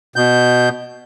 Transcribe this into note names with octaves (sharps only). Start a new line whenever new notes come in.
B2 G6